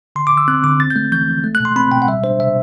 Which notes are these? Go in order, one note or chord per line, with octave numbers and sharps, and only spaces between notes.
D3 C6
D6
D3
E6
C4 F#6
D3 D6
C4 A6
G6
A3
E3 G6
E3
A3
F#6
B2
C6
C4 B5
B2 G5
F#5
G3 E5
D4 C5
C3 E5